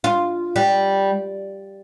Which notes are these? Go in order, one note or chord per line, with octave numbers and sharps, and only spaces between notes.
F4
G3